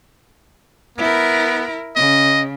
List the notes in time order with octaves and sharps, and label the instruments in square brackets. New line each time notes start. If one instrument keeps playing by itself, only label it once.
[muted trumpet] B3 [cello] E4 A#4
[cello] C#3 [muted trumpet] D#5